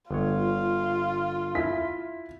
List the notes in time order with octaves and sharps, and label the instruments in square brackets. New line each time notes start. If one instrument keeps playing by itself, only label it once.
[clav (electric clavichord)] G1 C#5 [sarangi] F4
[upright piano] E4 B6